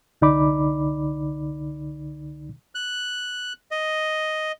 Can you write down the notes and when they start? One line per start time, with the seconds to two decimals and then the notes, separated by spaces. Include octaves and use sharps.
0.22 C2 D3 D#4 D5 B5 D6
2.75 F#6
3.71 D#5